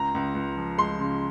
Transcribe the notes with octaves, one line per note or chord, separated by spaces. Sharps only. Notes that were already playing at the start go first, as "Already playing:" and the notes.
Already playing: C#2 A#5
C#2
C#2
F3
G#3 C6
C#3